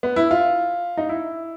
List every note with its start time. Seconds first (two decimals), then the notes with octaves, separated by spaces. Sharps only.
0.03 B3
0.16 E4
0.31 F4
0.97 D#4
1.09 E4